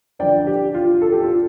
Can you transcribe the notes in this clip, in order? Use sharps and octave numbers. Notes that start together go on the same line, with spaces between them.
D3 F3 D4 D5 G5
G4
F4
A4
G4
F4